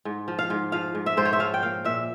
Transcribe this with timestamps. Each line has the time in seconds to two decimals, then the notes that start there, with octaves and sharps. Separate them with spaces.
0.05 G#2
0.28 F3
0.39 F5
0.50 G#2
0.72 F3 F5
0.95 G#2
1.06 E5
1.17 G#2 C5
1.25 C#5
1.33 E5
1.39 F3 F5
1.54 G5
1.63 A#3 F5
1.85 A#2 E5